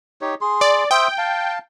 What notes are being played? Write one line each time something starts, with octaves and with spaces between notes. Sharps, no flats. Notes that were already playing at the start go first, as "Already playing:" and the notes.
D#4 G4 C#5
G#4 C6
D5
C5 E5 G5 D#6
F5 A5